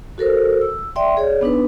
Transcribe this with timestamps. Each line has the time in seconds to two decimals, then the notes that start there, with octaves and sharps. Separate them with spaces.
0.18 F#4 A4 A#4 C5
0.62 E6
0.96 D5 E5 G5 C6
1.17 G#4 C#5 D5
1.41 B3 D4 D#4 B4